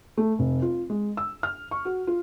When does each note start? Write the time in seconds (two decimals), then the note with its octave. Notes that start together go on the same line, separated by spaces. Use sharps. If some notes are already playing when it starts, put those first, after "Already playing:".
0.17 A3
0.39 F1
0.62 F4
0.90 G#3
1.17 E6
1.43 F6
1.71 C#6
1.85 F#4
2.07 F4